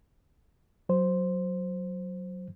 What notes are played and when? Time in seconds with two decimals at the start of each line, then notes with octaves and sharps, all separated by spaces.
0.89 F#3 C5